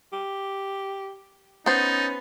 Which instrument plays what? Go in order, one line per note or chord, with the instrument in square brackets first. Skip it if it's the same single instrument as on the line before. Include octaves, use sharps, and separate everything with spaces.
[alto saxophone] G4
[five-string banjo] B3 C5 [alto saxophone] C#4 [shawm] D#4 [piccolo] A6